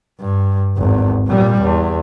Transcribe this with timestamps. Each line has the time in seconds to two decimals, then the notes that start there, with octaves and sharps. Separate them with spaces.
0.20 G2
0.77 G#1 E2
1.27 A#2 G3
1.62 E2